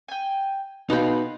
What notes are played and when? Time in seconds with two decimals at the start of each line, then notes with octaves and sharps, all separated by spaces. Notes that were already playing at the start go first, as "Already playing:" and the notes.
0.08 G5 G#5
0.90 B2 D#4 F5 G5 B5 C6